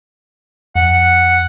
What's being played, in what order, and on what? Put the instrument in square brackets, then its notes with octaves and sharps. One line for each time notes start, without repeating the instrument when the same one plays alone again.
[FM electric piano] F2 [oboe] F#5